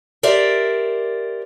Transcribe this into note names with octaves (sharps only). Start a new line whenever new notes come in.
G4 A#4 C5 D5 E5